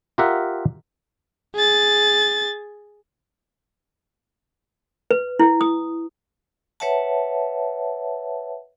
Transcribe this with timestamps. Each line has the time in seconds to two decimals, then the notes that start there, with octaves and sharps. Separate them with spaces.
0.18 F4 G4 A#4 E5 F#5
1.55 G#4 A6
5.11 B4
5.39 E4
5.61 D#6
6.80 B4 C#5 E5 F#5 A5